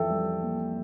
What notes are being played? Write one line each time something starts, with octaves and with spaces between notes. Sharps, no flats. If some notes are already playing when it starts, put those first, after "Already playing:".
Already playing: F2 E3 A4 E5 G5
G3
A#3